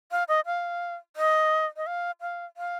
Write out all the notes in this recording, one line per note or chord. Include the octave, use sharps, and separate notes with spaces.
F5
D#5
F5
D#5
D#5
F5
F5
F5